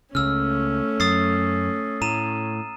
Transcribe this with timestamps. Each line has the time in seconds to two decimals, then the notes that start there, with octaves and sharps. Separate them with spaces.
0.15 C#2 C#3 A3 C#4 E6 F6
1.00 F#2 D#6 A6 C7
2.02 A2 A#5 D#7 E7